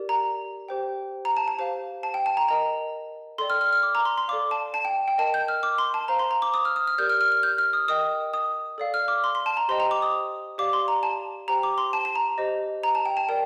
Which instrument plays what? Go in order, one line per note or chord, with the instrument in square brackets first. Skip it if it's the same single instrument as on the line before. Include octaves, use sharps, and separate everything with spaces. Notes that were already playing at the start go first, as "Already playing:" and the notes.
Already playing: [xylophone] G4 A#4 D5
A#5
G4 C5 G5
A#5
A5
A5
G4 C5 F5 A5
A5
G5
A5
A#5
A#4 D#5 G5 A#5
A4 D5 G5 C6
F6
F6
F6
D6
A#5
C6
C6
A4 D5 F5 D6
A5
A5
G5
G5
A#4 D#5 G5 A5
G6
F6
D6
C6
A5
C5 F5 A#5
C6
A#5
D6
D#6
F6
D#6
F6
G4 A#4 D5 G6
F6
F6
F6
G6
F6
D#6
A#4 D#5 G5 D#6
D#6
A4 D5 F5
F6
D6
C6
C6
A5
A#5
G4 C5 D#5 G5 C6
A#5
D6
D#6
G4 D5 F5 D6
C6
A#5
A5
G4 C5 G5 A#5
D6
C6
A5
A5
A#5
G4 C5 D#5
A#5
A5
G5
A5
A#4 D5 G5